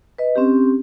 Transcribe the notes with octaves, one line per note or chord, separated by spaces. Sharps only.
B4 D#5
C4 C#4 G4